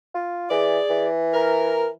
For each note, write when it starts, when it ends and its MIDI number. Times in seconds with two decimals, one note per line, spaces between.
0.14 0.46 65
0.51 0.80 52
0.51 1.07 68
0.51 1.07 74
0.89 1.91 52
1.33 1.88 70